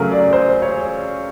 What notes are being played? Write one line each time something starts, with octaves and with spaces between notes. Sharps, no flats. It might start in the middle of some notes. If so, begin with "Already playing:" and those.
Already playing: C#3 F#3 A3 G#4 A#4
D5
C5
C#5